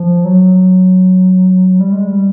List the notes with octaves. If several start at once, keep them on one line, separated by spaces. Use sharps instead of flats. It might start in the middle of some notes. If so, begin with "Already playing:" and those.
Already playing: F3
F#3
F#3
G3
G#3
G3